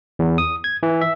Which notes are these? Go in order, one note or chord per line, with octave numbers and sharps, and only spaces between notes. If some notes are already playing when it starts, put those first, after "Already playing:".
E2
D#6
G#6
E3
E5